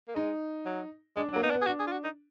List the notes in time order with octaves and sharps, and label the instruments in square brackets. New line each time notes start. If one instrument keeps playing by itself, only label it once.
[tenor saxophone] A#3
[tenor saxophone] G#3 [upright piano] D#4
[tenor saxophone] F#3
[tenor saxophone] G#3 [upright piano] D4
[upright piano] D4
[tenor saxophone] F#3
[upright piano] A#3
[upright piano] B3 [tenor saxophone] D#4
[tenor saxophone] D4
[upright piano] B3
[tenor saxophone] G#4
[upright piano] D4 [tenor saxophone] F#4
[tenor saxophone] G#4
F4
F#4
D#4